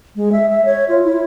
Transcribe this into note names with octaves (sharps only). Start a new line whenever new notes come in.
G#3
E5
E5
C#5
F4
E4